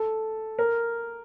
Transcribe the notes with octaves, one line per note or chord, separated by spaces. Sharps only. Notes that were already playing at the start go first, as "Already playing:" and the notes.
Already playing: A4
A#4